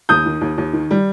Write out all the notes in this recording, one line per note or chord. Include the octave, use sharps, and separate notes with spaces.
D#2 D#6 G6
D#3
D#2
D#2
D#3
G3